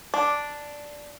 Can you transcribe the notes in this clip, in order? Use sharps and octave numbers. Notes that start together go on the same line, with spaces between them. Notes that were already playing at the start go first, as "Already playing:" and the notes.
D4